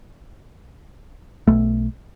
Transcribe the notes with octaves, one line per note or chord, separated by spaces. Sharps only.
B1 A3